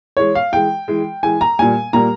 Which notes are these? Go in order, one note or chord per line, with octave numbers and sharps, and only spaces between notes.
E3 G#3 C#5
F5
E3 G#3 G5
E3 G#3
E3 G#3 G#5
A#5
A#2 G3 A#3 G#5
A#2 G3 A#3 A#5